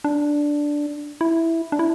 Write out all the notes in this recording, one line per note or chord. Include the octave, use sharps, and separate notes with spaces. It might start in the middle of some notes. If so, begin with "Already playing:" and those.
D4
E4
D4
E4